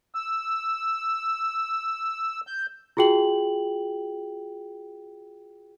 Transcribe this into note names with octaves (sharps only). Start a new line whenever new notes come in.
E6
G6
F4 F#4 G#4 G5 F#7